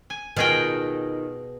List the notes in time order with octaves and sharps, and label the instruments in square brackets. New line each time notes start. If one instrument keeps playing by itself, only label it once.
[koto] G#5
[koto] B2 G#4 G5 [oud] D#3 F4